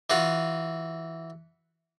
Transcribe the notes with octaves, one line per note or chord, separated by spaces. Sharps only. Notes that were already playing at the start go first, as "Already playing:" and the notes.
E3 F4 F#4